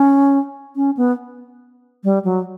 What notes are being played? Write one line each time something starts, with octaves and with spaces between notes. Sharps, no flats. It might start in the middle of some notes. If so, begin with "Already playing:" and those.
Already playing: C#4
C#4
B3
G3
F#3